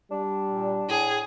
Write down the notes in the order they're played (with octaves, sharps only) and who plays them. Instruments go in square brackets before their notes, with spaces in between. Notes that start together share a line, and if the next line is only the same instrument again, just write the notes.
[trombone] G3 [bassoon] D4
[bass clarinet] A#2
[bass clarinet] A2 [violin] G#4